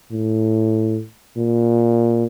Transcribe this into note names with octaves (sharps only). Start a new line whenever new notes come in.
A2
A#2